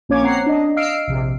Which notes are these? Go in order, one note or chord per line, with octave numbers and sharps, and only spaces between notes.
A#1 A#3 C#4 C#5 D6 G#6
C4 C#5 F#5 A#5 C7
D4 D#5
D#5 F5 E6 F6 C7 D7
A#1 C3